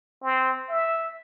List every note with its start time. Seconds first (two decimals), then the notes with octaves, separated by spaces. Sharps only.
0.23 C4
0.70 E5